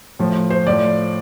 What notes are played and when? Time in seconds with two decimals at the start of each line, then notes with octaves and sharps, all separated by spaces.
0.19 A2 F3
0.50 C5
0.67 A2 F3 D5